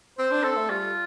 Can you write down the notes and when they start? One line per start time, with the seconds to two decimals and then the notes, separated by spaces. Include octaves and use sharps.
0.19 C4 C5
0.32 D4
0.43 C4 A4
0.57 A3
0.70 G3 F4